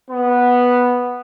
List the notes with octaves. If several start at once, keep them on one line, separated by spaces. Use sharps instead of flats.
B3